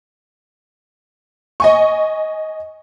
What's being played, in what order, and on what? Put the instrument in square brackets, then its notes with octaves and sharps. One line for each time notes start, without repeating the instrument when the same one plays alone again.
[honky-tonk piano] D#5 G#5 C#6